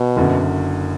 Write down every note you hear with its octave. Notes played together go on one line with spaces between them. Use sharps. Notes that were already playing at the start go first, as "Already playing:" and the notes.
Already playing: B2
F#1 F#2 D3